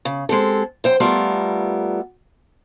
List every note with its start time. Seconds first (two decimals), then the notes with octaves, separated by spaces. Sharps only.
0.05 C#3
0.29 G#3 C4 G4 A4
0.84 F#2 C5 G5
1.00 G3 A3 B3 F4 A4 A#4